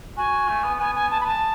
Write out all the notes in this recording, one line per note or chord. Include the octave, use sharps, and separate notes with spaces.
F#4 G#5
A3
B3
B3 G#5
G#5
A5
B5
A5